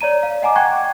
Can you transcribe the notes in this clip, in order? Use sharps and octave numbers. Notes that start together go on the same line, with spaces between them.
C#5 D5 A#5 D#7
F5
D#5 F#5 G#5 A#5 D6
F#5 G5 C#6 F#6 G#6